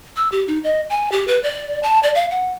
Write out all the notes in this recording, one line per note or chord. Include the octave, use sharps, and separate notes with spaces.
E6
G4
D#4
D#5
G#5
G4
B4
D5
A5
D5
F5
F#5